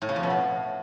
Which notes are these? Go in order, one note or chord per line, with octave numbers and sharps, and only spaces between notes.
A2
C#3
F2
B2
A2